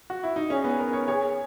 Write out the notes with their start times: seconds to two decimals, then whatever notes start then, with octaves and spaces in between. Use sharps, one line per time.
0.10 F#4
0.23 E4
0.36 D#4
0.50 C#4 G#4
0.64 B3
0.79 A#4
0.93 C#5
1.08 G#4 C#5